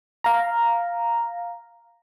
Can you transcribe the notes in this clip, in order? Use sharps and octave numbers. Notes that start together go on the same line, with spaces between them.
F5 A#5